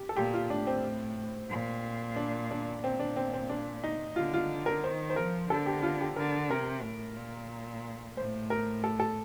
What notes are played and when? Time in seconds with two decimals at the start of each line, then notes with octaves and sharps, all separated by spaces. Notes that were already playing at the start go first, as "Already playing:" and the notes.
Already playing: G4
0.09 A4
0.16 A#2 G4
0.34 F4
0.50 A2 D4
0.67 C4
1.50 A#2
2.16 D4
2.51 D4
2.83 A#2 C4
2.99 D4
3.16 C4
3.33 C4
3.49 D4
3.84 D#4
4.16 D3 F4
4.34 F4
4.66 A#4
4.84 D#3 C5
5.10 C5
5.16 F3 A#4
5.50 D3 A4
5.66 G4
5.83 F4
6.01 G4
6.16 D3 A#4
6.50 C3 A#4
6.83 A2
7.17 A#2
8.17 A2 C5
8.50 A#4
8.84 A4
9.00 A4